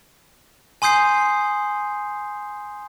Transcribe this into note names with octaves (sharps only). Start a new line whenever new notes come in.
G#5 C6 D#6 G6 C7